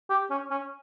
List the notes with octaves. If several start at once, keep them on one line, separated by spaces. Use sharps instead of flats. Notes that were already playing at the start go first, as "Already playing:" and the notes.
G4
C#4
C#4